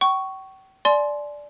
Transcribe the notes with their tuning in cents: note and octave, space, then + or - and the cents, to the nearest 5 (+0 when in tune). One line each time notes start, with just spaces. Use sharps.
G5 -40 C#6 +0
D5 +0 G#5 +35 C6 +0